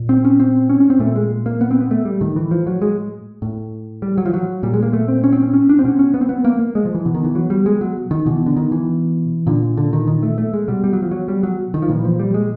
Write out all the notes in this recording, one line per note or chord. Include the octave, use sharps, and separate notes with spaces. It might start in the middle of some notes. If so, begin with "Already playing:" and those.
Already playing: A#2
C4
C#4
C4
C#4
C#4
C4
A#2 A3
G#3
A#3
B3
C4
B3
A3
G3
A2 D#3
E3
F3
F#3
G#3
A2
G3
F#3
F3
F#3
A#2 G3
G#3
A#3
A3
C4
C#4
C4
C#4
C#4
D4
C4
B2 C#4
C#4
B3
C4
B3
A#3
A#3
G#3
F3
E3
B2
D#3
E3
F#3
G3
G#3
F#3
D#3
B2 E3
D3
D#3
E3
A#2 D3
D3
D#3
D#3
A3
A3
G#3
B2 G3
G3
F#3
F3
F#3
G3
F#3
D#3
F3
A#2 E3
F3
G3
G#3